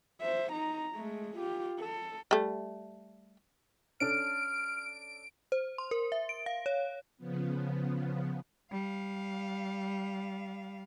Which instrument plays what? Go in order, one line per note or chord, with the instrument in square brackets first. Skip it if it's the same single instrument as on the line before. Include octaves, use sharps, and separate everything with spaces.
[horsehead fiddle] C5 E5
D#4 A#5
G#3 A3
F4 G4
A4
[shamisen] G3 A3
[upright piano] C#4 D4 A4 [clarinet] F6 [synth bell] D7
[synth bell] C5
C6
A#4
E5
D7
F5
C#5
[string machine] C#3 F3 B3
[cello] G3 F5